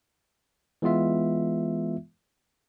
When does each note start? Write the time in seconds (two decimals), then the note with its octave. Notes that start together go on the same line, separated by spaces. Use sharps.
0.82 E3 G#3 B3 F4 E5